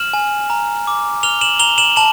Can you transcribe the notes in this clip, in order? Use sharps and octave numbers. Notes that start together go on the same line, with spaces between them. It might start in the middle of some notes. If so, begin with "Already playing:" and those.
Already playing: F6 E7 F#7
G#5
A#5
D6
F6 F7 G7
E7 F#7
A#5 F7 G7
E7 F#7
A5 E7 F#7